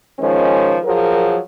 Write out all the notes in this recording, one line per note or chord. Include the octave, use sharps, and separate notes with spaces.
D#3 F3 G#3 C#4
F3 F#3 G#4 A#4